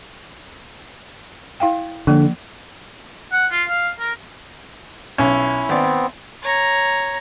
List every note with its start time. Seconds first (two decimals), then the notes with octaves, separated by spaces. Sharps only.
1.60 E4 F5 G5
2.07 D3 F3 A#3
3.32 F#5
3.51 F4
3.68 F5
3.99 A#4
5.18 B1 C#4 E4
5.69 G#1 B3 C4 D5
6.43 C#5 A#5